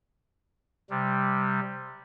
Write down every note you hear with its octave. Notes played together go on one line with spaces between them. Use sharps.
C3 G3